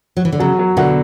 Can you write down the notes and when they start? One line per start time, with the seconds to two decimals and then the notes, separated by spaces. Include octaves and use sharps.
0.17 F#3
0.25 E3
0.32 D3
0.40 C#3 F#3
0.59 F#3
0.77 B2 D3 F#4